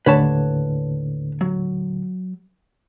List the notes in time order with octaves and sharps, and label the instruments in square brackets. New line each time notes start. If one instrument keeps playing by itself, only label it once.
[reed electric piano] D#2 A2 D3 [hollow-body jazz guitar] B4 C#5 A5
[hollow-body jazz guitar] F#3